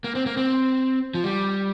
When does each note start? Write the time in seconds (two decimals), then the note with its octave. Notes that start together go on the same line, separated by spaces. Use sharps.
0.04 A#3
0.15 C4
0.26 A#3
0.37 C4
1.14 F3
1.24 G3